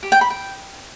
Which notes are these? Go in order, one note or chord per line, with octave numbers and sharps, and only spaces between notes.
G4
G5
B5
G5